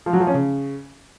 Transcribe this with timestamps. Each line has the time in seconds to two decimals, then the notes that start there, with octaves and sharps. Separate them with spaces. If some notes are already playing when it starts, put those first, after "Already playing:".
0.06 F3
0.13 F#3
0.20 F3
0.27 C#4
0.34 C#3